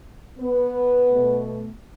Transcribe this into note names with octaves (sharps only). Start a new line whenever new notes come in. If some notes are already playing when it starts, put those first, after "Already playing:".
B3 B4
B2 A3